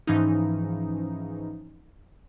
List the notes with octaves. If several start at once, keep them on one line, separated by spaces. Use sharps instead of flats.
G#2 E3 F3 C#4 D#4